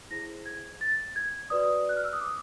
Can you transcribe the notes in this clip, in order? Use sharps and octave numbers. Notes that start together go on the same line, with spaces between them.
E4 G#4 C5 A#6
G#6
A6
G#6
F#4 B4 D5 D#6
F#6
F6
E6
D#6
D6